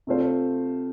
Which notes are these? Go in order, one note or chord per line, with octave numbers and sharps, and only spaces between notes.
C3 A3 F4 C5